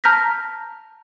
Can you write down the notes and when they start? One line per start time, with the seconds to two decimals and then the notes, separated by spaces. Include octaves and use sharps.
0.04 A5 A#5 F6 G6 A#6 B6